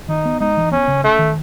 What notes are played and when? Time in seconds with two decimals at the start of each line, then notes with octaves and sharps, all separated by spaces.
0.08 D#3 D#4
0.25 B3
0.40 G#3 D#4
0.57 E3
0.71 B3 C#4
0.88 C#3
1.03 A3 C#4
1.19 D#3